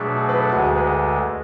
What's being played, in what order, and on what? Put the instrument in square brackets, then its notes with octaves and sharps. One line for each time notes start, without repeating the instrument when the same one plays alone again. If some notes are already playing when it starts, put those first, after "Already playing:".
Already playing: [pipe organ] B2 F#3 A3 D4 [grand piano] G#4
[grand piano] G#4
B4
A4
[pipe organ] D2 D3 G#3 [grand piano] F#4
[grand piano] G#4
B4
A4